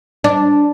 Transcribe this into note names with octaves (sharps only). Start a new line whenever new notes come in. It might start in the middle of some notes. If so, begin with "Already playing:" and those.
D4